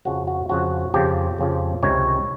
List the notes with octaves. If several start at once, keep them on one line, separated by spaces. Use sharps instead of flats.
F2 C#3 F3 F#4
F#4
F2 C#3 F3 F#4
F2 C#3 F3 G4
F2 C#3 F3
C#2 C3 D#3 C#5